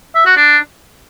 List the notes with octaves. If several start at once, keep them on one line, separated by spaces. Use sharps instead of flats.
E5
F#4
D4